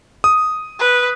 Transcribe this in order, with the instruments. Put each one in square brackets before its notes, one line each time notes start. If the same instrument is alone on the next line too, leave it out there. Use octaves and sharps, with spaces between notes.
[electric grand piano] D#6
[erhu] B4